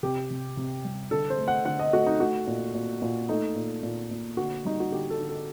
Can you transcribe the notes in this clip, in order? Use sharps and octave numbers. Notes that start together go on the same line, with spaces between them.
C3 G4
C3
C3
G3
D3 A4
C5
A3
F#5
D3 F#5
D#5
A3 F#4
D#4
A3 F#4
A#2
A#2
A#2
A3 D#4
A#2
A#2
A#2
D3 F#4
G3 D#4
F#4
D3 G4
A4
D3
A4